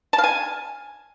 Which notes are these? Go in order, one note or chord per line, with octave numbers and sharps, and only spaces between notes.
A5
F5
G#5